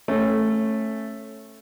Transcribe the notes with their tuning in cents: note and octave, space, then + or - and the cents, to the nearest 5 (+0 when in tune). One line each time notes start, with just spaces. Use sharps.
A3 +0 C#4 -20